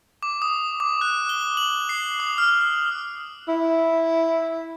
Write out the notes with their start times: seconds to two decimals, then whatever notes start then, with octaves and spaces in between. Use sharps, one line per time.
0.23 D6
0.42 D#6
0.80 D6
1.01 F#6
1.29 G7
1.57 F#7
1.89 C7
2.20 D#6
2.38 F6
3.48 E4